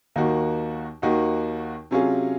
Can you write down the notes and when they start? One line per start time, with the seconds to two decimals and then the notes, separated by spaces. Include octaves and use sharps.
0.16 D#2 D#3 A#3 D#4 F#4
1.02 D#2 D#3 A#3 D#4 F#4
1.91 C3 F#3 C#4 F4 G#4